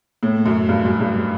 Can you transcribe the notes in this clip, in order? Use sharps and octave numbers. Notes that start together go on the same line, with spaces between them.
A2
F#2
G2
F#2
G2